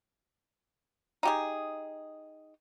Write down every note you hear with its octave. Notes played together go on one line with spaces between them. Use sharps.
D#4 G4 G#4